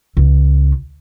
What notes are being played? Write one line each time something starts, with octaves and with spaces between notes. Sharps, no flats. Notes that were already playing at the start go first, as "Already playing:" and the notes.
C#2